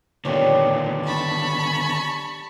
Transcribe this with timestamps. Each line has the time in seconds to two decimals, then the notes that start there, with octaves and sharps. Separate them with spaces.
0.25 A#2 D3 D#3 B3 G4 C#5 D5
1.06 A5 B5 C#6